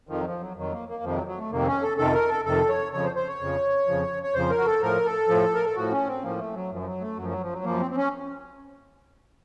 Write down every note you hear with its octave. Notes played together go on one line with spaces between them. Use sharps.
F2 D#3 F3
F#3
F3
F#3
F2 D#3 F#3
A#3
A#3
F2 C3 D#3 F3
F#3
F#3
A3
F2 C3 D#3 A#3
C4
C#4
A4
F2 C3 D#3 A4
A#4
A4
F2 C3 D#3 A4
C#5
F2 C#3 F3 C#5
C5
C5
C#5
F2 C#3 F3
F2 C#3 F3
C#5
F2 C#3 F3 C5
A#4
F#4
A4
A2 F3 A#4
A4
A2 F3
A#4
A4
A2 F3 F#4
C#4
C4
A2 F3 A#3
A3
F#3
F#2 F3
F3
F#3
A3
F#2 F3 F#3
F#3
F3
F#3
F#2 F3 A#3
C4
C4
C#4